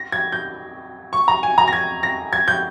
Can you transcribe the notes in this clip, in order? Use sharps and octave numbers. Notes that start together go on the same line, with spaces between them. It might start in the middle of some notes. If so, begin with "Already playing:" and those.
Already playing: A#6
G#6
G6
C#6
A#5
G#5
A#5
A#6
G#6
A#6
G#6
G6